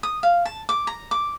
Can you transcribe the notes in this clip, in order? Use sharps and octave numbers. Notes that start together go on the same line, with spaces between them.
D#6
F5
A5
D6
A#5
D6